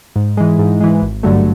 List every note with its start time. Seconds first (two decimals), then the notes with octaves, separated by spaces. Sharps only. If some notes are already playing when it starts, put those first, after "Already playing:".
0.16 G#2
0.37 E3 G#3
0.59 G#2
0.81 E3 G#3
1.02 G#1
1.23 G2 D3 F#3 A3